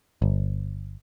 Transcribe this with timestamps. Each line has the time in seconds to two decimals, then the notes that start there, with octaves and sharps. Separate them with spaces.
0.22 G1